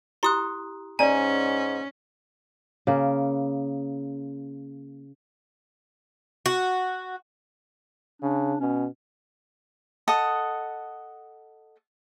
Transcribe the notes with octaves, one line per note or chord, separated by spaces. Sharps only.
E4 G4 A#5 C6 D#6 F#6
G#2 C#4 D5 G#5 A#5
C#3 A#3
F#4
C#3 D4
B2 C#4
A4 D#5 F#5 D#6